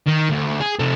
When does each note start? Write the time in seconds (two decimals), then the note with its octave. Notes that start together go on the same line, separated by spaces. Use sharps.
0.06 D#3
0.29 D2
0.60 G#4
0.79 C3 A3